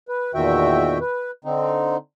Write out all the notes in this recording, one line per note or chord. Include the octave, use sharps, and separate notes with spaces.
B4
E2 A#2 D#3 F#4 E5 G5
B4
D3 C4 D#4